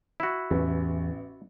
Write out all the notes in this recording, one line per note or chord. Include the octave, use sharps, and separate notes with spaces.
E4 F#4
A1 E2 E3